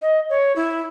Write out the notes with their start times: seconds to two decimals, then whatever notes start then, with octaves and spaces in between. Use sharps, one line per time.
0.02 D#5
0.30 C#5
0.56 E4